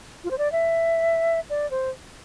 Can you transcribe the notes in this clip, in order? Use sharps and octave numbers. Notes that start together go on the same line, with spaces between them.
F4
C5
D5
E5
D5
C5